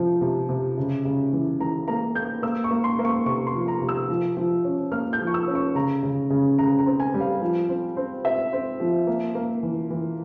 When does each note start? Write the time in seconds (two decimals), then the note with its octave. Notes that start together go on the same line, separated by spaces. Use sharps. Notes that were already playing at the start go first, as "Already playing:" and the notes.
Already playing: C3 F3
0.21 C3
0.49 C3
0.78 C#3
1.05 C#3
1.33 E3
1.60 E3 A#5
1.88 A#3 A#5
2.15 A#3 G6
2.42 A#3 E6
2.64 C#6
2.71 A#3
2.84 C6
2.99 A#3
3.05 C#6
3.26 C3 C#6
3.47 C6
3.54 F3
3.68 A#5
3.81 C3
3.89 E6
4.09 F3
4.37 F3
4.64 C#4
4.92 A#3 F6
5.13 G6
5.21 F3
5.27 C#6
5.34 E6
5.47 C#4
5.55 C#6
5.75 C#3 A#5
6.03 C#3
6.30 C#3
6.59 C#3 A#5
6.79 A#5
6.86 C4
7.00 G#5
7.14 G3
7.21 F5
7.42 F3
7.69 C4
7.97 C4
8.25 C4 E5
8.53 C4
8.80 F3
9.07 A#3
9.35 A#3
9.63 E3
9.90 E3